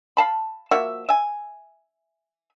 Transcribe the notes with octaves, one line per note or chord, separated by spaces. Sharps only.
F5 A5 B5
F3 A#3 F#4 E5
E5 G#5